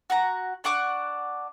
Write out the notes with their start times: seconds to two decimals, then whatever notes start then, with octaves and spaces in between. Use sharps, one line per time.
0.10 F#4 F#5 A#5
0.64 D4 F#5 C#6 D6